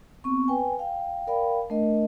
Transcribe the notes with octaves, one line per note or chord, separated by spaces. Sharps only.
B3 C4 C#6
B4 G5 G#5
F5 G5
A#4 D5 F5 G5 B5
A3 D4 A#4 D#5